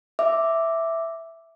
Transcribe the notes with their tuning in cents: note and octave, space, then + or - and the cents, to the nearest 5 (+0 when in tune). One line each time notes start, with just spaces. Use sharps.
E5 +0 D6 +0